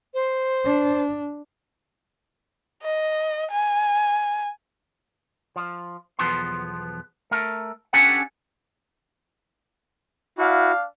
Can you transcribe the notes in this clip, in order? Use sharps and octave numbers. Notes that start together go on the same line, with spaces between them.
C5
D4
D#5
G#5
F3
B1 E2 F3 B3 C6
A3 A#4
C#4 D4 G4 A4 F#5 G#5
D4 E4 F#4 F5